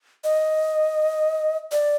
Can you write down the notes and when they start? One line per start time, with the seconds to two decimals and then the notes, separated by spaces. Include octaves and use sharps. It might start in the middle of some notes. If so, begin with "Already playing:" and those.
0.24 D#5
1.72 D5